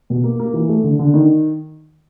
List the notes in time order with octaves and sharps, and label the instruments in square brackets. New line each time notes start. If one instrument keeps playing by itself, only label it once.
[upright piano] B2
A#3
A#3
E3
A3
D3
D3
D#3